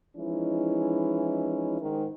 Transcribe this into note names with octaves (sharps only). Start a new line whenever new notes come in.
E3 F3 G#3 C#4 D#4 E4
G#2 D#3